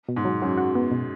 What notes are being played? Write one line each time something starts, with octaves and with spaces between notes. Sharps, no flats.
B2
G#2
F#3
F#2 F#3
F#4
B3
B2